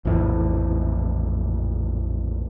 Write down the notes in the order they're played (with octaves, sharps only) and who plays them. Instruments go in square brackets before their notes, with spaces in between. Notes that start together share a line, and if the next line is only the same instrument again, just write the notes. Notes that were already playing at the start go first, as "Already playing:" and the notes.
[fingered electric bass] A#1 F2 A2 E3